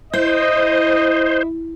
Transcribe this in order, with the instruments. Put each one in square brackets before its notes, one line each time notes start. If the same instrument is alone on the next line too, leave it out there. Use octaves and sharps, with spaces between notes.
[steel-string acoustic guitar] E4 [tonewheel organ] C5 [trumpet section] D#5